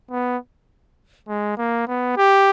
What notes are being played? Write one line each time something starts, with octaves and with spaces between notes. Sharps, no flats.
B3
G#3
A#3
B3
G4